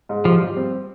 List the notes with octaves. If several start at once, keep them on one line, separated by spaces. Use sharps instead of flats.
G#2
F3 G4
G3
C4